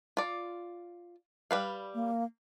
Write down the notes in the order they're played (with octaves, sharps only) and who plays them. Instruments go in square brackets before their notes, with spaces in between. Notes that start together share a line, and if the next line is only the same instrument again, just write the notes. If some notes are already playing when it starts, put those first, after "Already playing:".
[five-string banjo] F4 D5
G3 B4 F5
[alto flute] A#3